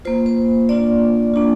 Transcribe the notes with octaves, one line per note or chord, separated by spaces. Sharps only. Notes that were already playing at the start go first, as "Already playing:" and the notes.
A#3 F4 C5
C5
A#3 D4 F4 D5
A#3 D4 F4